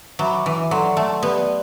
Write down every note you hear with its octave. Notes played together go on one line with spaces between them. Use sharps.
F#3 F#4 B4 E5 B5 D6
E3
F#3 A4 D5 F#5 C6
A3
B3 G4 B4 D5